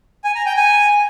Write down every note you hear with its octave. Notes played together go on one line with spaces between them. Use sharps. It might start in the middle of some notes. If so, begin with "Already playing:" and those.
G#5
A#5
G5
G#5